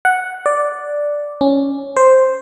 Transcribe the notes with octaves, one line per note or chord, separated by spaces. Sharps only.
F#5
D5
C#4
C5